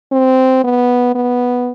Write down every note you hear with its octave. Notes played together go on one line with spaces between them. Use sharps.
C4
B3
B3